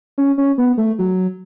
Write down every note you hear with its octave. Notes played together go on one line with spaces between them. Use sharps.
C#4
C#4
B3
A3
F#3